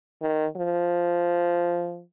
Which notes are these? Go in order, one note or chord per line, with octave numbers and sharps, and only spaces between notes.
D#3
F3